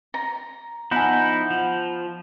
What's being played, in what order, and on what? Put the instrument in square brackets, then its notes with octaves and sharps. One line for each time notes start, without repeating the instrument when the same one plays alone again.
[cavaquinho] A#5
[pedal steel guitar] F3 D#4 E4 [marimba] B3 G#5 [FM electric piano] F#5 B5 G6
[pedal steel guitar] F3